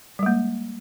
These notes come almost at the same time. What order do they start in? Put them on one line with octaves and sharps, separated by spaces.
G3 G#3 A#3